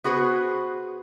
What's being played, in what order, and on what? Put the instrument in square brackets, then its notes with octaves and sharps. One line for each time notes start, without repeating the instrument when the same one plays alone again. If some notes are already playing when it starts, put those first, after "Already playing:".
[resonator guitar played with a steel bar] B3 F#4 G#4 B4 C5